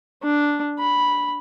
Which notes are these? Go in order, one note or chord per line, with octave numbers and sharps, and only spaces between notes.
D4
B5